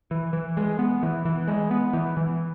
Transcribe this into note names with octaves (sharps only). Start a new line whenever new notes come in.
E3
E3
G#3
B3
E3
E3
G#3
B3
E3
E3